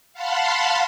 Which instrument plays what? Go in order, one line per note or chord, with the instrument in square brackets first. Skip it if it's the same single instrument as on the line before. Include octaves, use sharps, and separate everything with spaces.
[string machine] F5 F#5 A5 B5 C6